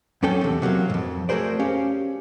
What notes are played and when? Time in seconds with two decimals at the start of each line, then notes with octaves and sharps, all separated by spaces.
0.23 F2 F#3 C#4 A4 G5
0.41 E2 C3
0.62 C3 F#3 G#3 A#3
0.90 F2 G#2
1.29 A3 F#4 G#4 A#4 C5 D5
1.59 C#4 G4 F5